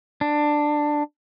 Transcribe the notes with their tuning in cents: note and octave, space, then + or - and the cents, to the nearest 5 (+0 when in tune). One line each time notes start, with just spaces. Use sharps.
D4 +10